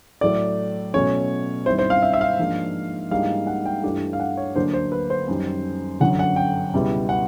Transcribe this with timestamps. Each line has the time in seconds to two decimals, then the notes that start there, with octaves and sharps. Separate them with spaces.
0.21 A2 F#3 A3 D5
0.94 B2 F#3 A3 C#4 C#5
1.66 G2 D#3 G3 C4 E4 C5
1.79 C5
1.90 F5
2.03 E5
2.14 E5
2.21 F5
2.39 G#2 F3 A#3 D4
3.11 G#2 E3 G3 A#3 D4 F5
3.47 F#5
3.66 G5
3.83 G2 E3 A3 D4 G4
4.13 F5
4.20 F#5
4.37 C#5
4.56 D2 D3 F#3 A#3 D4 C5
4.73 C5
4.92 B4
5.10 C5
5.28 F#2 D#3 G3
6.00 G1 F#2 D3 F#3 F#5
6.19 F#5
6.36 G5
6.73 C#2 B2 G3 B3 E4
7.09 F#5